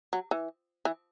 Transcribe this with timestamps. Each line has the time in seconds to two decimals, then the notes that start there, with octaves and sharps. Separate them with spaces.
0.13 F#3
0.31 E3
0.85 E3